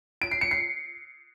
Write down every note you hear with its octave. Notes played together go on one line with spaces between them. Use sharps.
D7
C7
C#7
C7